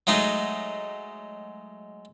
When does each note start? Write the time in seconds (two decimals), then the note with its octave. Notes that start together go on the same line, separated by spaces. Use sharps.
0.07 F#3 G#3 A3 D#4